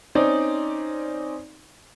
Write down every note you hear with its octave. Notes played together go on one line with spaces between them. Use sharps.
C4 C#4 D#4 D5